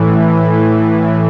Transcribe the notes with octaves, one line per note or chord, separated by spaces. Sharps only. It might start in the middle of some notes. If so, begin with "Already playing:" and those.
Already playing: A2 E3